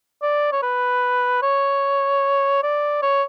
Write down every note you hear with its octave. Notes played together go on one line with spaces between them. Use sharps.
D5
C#5
B4
C#5
D5
C#5